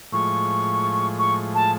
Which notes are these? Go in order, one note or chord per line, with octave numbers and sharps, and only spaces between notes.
A2 F3 G#3 C#6
C#6
A5